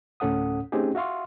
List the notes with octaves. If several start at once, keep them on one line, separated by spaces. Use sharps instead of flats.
D2 A2 C#4 A4 F#5 D#6
A3 C4 C#4 D#4 G4 G#4
F#4 E5 F5 C6 C#6